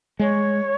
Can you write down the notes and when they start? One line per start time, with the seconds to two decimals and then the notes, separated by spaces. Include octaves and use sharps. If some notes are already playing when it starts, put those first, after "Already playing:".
0.19 G#3 C#5